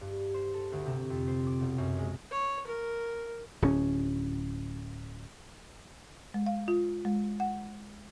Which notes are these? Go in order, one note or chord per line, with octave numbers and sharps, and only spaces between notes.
G2
C5
A4
D2
C3
F2
C5
D6
B1
F#2
G#3
C#5
A#4
D1 C#4
G#3
F5
F4
G#3
F#5